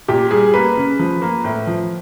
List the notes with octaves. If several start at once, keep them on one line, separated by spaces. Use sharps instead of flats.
A#2 G4
G3 G#4
A#3 B4
C#3
F3
A#3
A2
F3